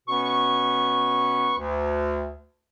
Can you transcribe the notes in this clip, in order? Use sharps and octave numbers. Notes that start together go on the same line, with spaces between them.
B2 B3 C#4 B4 C#6
D2